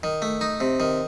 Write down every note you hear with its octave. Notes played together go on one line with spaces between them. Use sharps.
D#3
A3
D#4
C3
D#3